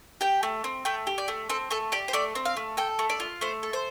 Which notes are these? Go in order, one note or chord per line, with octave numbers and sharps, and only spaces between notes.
G4 G5
A3
C4
A3 G5
G4
D5
A3
C4 A4
A3 A4
G4 D5
C5
A3 D5
C4
F5
A3
A4 G5
A3
D5
F4
A3 C5
A4
C5